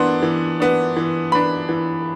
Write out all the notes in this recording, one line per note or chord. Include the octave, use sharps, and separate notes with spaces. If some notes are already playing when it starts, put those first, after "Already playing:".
Already playing: E3 B3 D4 C6
E3
B3 D4
E3
B3 D4 B5
E3